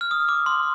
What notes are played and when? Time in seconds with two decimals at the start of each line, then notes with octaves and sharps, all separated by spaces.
0.01 F6
0.11 D#6
0.29 D6
0.46 C6